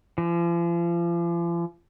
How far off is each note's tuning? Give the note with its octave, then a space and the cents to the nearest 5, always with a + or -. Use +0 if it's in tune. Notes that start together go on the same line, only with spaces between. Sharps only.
F3 -40